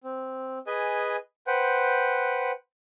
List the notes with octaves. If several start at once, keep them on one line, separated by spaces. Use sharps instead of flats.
C4
G#4 B4 D#5 G#5
B4 C5 F#5 G5